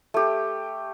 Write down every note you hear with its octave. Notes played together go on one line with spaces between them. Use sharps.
A3 G4